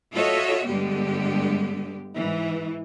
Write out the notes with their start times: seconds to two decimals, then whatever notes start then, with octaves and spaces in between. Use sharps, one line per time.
0.13 F4 F#4 A4 C#5 D#5 E5
0.65 G2 D3 G3 G#3 B3 G4
2.15 G#2 E3